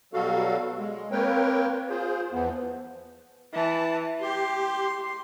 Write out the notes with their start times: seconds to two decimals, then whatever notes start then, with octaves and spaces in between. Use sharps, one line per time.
0.13 B2 F#3 G3 F#4 A4 F5
0.79 G#3
1.11 A#3 C4 A#4 B4 C#5 G5
1.90 F4 G#4 C5
2.32 E2 E3 F3 B3
3.54 E3 A5
4.22 G4 C6